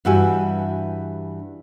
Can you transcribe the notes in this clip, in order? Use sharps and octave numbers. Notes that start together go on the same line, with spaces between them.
G2 E3 F#4 G4 E5 G#5